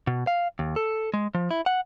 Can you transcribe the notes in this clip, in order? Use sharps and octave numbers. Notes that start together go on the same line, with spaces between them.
B2
F5
D#2
A4
G#3
F3
E4
F#5